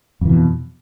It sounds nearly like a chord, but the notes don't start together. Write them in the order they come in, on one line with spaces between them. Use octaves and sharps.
F2 E3 B2